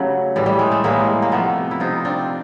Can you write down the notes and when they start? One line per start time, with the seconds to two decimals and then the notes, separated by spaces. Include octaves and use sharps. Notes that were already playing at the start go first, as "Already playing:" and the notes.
Already playing: C#3 F#3 G3 A3
0.36 A2 E3 G3
0.46 G3
0.59 G#3
0.71 A3
0.84 A2 E3 G3 G#3 A#3
1.22 A#3
1.32 C3 F3 A3 B3
1.71 E4
1.80 C3 F3 D#4 F4
2.05 C4 D4